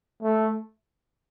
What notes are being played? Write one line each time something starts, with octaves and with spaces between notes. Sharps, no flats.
A3